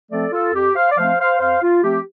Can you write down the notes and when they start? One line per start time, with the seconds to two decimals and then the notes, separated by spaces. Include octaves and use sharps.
0.11 F3 A3 C4 A4 D5
0.32 F4 A4
0.54 F2 G4
0.76 C5 F5
0.91 D5
0.97 F3 A3 C4 C5 F5
1.19 C5 F5
1.40 F2 C5 F5
1.62 F4
1.83 F3 A3 C4 G4